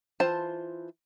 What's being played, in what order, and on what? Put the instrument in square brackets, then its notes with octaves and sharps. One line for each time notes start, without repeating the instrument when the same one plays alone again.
[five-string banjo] E3 F4 C5 A5